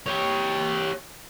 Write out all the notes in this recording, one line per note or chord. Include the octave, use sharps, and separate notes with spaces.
G4 C#5